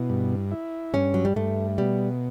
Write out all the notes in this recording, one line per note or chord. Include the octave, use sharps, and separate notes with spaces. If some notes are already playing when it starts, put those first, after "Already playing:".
Already playing: B2 E4
G2
E4
G2 C#4
F#3
G3
G2 A3
B2 G3